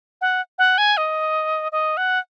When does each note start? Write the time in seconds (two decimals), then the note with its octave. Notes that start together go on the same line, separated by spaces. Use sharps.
0.21 F#5
0.58 F#5
0.78 G#5
0.97 D#5
1.72 D#5
1.97 F#5